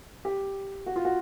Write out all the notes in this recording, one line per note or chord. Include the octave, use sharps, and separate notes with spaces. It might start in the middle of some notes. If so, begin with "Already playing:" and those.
G4
F#4
F4
F#4